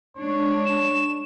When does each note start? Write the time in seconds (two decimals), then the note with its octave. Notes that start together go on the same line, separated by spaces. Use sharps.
0.17 G#3 D4 C#5
0.66 E7